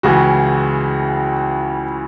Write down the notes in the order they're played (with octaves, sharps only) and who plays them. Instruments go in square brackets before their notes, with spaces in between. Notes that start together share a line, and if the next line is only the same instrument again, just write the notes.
[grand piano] C#2 C#3 E3 F#4